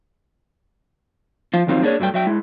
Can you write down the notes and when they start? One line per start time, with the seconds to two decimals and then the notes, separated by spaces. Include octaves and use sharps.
1.54 F3 F4
1.67 F2 D#3 F#3 C4 D#4 F4
1.82 A#3 C4 D4 F#4 G#4 C#5
2.00 G2 F#3 G3 A3 G5
2.14 F#3 E5 G5
2.27 G#3 E4